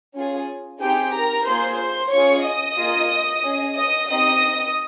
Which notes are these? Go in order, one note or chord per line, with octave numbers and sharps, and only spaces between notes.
C#4 F4 G#4
C4 D#4 G4 G#4 G5
A#4 A#5
A#3 F4 G#4 C5 C6
C5 C6
C#4 F4 G#4 C#5 C#6
D#5 D#6
A#3 F4 G#4
C#4 G#4
D#5 D#6
C4 D#4 G4 D#5 D#6